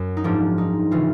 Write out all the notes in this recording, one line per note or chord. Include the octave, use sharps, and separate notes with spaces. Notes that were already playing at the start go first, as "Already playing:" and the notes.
Already playing: F#2
D#4
G#2 F3 D4
D#4
C#3 E3 F4